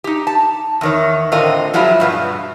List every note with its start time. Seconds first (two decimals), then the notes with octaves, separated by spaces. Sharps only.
0.04 D#4 G4
0.27 A5
0.81 E2 D#3 C#5
1.32 A2 D3 C4 F4 A#4 D#5
1.73 F3 F#3 G#3 E4 F4
2.00 G2 B2 B3